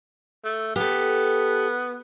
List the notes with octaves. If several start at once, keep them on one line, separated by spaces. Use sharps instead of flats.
A3
B3 G4 A4